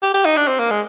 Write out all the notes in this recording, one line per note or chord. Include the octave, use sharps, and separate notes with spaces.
G4
G4
D#4
D4
C4
A#3
G#3